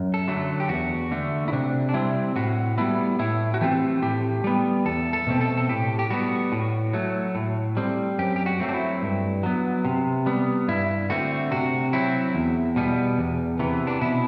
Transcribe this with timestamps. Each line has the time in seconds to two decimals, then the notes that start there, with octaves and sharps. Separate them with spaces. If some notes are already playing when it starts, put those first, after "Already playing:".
Already playing: F#2
0.14 A4
0.27 D3 F#3 A3
0.60 G4
0.69 E2 F#4
1.11 D3 A3
1.48 E4
1.52 C3 D4
1.89 D4
1.94 G3 C4 E4
2.36 A2 F#4
2.78 G3 B3 E4
3.19 A2 E4
3.54 F#4
3.61 E3 A3 C4 G4
4.02 A2 G4
4.44 G3 B3
4.85 E2 A4
5.13 A4
5.27 B2 A3 C4
5.41 A4
5.57 A4
5.69 A2 G4
5.99 G4
6.11 G3 B3 F#4
6.52 A2
6.93 F#3 A3
7.35 A2
7.77 G3 C4
8.18 F#2 G4
8.36 G4
8.46 F#4
8.60 F#3 A3 C4
8.69 D4
8.74 E4
9.02 G2
9.43 F#3 B3
9.85 C3
10.26 G3 B3
10.68 G2 E4
11.10 D3 A3 C4 F#4
11.51 C3 F#4
11.93 F#3 C4 E4
12.35 E2
12.76 B2 G3 B3
13.18 E2
13.59 C3 E3 B3
13.87 D4
14.01 B2 E4